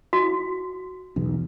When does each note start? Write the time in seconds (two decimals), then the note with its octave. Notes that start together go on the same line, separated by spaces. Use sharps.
0.13 F#4
1.16 B1 E2